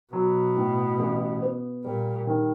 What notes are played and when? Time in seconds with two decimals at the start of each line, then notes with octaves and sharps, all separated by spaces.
0.13 B2 F#3
0.57 A2
0.99 A1
1.42 B3
1.85 A#2 G3
2.27 D#3